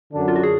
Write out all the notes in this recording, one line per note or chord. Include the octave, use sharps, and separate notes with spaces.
F#2 D3 F#3 D4
F4
F#4
G#4